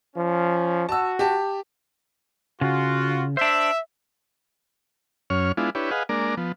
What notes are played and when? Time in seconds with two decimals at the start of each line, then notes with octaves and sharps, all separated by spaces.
0.15 F3 C#4
0.89 F#4 A5 E6
1.19 G4 A5
2.61 C#3 F4 F#4
3.37 D4 C5 E5
5.30 F#2 C#4 C#5 F6
5.57 G#3 B3 D4 E4 F4
5.75 D4 E4 G4 B4 C#5
5.91 G#4 B4 D#5 F5 F#5
6.09 G#3 A#3 D4 A#4 D5
6.37 F3 B3